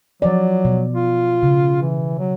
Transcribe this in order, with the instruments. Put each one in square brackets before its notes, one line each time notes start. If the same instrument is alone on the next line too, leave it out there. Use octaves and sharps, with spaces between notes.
[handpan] F3 D5 [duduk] F#3
[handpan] B2
[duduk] F4
[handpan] C#3
[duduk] E3
F#3